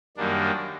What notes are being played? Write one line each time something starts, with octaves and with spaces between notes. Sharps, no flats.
F#2 D#3 G3 A#3 D4